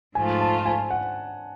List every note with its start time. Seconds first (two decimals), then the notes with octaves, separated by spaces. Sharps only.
0.15 G#2 F3 A3 F4 G#5
0.41 A5
0.66 G#5
0.90 F#5